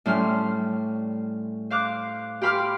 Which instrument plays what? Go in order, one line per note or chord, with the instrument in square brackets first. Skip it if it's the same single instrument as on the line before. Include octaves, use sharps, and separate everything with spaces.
[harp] A2 G3 C#4 B5 C6 F6
C5 F5 D6 F#6
G4 F5 B5 C6 D6 F6